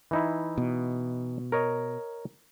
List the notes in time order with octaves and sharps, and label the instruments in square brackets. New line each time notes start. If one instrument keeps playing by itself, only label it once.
[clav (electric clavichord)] E3 D#4 E4
[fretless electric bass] B2
[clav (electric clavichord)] A#4 C#5 D#5